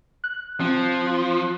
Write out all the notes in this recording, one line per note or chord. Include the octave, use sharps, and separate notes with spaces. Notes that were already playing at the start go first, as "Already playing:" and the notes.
F#6
F3 C4